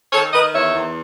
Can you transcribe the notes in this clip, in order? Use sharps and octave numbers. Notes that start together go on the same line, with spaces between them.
D#3 A4 C#5
D#3 B4 D#5
E2 C#5 E5
E2